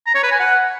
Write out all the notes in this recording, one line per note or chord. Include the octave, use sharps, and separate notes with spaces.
A#5
C#5
B4
G#5
F#5